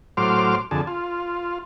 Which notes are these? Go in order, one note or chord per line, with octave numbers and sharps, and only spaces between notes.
A2 F#3 C5 C6 D6 F6
F2 D3 G#4 A5
F4